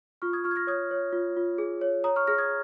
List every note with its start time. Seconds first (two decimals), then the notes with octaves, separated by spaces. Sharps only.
0.22 F4 C#6 F6
0.33 D#6 G#6
0.44 F4 C#6 F6
0.51 G#6
0.56 F6 A#6
0.67 C#5 D#6 G#6
0.91 C#5
1.13 F4
1.37 F4
1.58 G#4
1.81 C#5
2.04 C#5 A#5 D#6
2.16 C#6 F6
2.27 G#4 F6 A#6
2.38 D#6 G#6